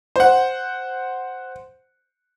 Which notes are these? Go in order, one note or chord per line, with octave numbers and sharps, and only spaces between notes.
C5 F#5